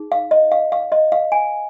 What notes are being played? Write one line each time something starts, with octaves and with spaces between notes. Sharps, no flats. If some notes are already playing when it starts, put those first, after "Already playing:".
Already playing: D#4 G#4
F5
D#5
F5
F5
D#5
F5
G#5